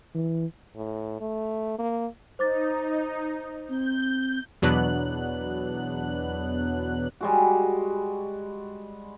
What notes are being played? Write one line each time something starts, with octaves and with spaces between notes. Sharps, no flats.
E3
A2
A3
A#3
D#4 C5 D6 A6
C4 G6
E2 B2 F#3 B3 D4 F#6
G3 G#3 F#4